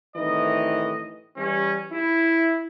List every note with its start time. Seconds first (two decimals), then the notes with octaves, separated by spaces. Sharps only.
0.16 C2 A2 D#3 E3 D#5
1.37 E3 G3 C#4
1.93 E4